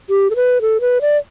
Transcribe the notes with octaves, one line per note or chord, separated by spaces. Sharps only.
G4
A4
B4
A4
B4
D5